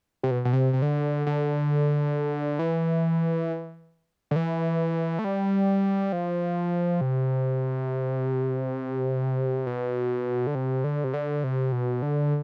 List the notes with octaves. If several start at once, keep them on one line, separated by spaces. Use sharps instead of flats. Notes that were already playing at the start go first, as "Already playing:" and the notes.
C3
B2
B2
C3
C3
D3
D3
E3
D3
E3
A3
G3
F3
C3
B2
D3
C3
D3
C3
D3
C3
B2
D3